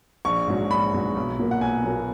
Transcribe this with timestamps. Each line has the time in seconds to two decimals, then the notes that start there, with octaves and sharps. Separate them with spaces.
0.25 A#1 C#6
0.48 G#2 F#3
0.71 A#1 B5
0.93 G#2 F#3
1.16 B1
1.39 A#2 F#3 A#3
1.51 F#5
1.61 B1 G#5
1.84 A#2 F#3 A#3